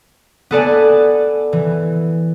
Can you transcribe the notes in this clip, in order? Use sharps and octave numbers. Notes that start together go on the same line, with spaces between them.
B3 A4 D5 G#5
E3